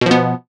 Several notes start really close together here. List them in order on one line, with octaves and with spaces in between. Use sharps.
B2 F3 B3